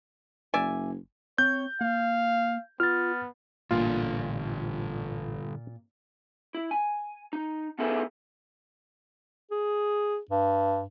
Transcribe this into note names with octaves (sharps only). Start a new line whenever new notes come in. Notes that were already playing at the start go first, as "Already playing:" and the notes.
F#1 D5 E5 G#5
C4 C#5 G6
A#3 F5
B3 F4 F6 A6
A1 G2 A#2 D3 F4
E4
G#5
D#4
B3 D#4 E4 G#4 A4 B4
G#4
G2